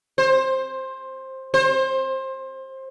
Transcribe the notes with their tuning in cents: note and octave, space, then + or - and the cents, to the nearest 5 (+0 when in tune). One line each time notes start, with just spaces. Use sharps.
C5 +15
C5 +20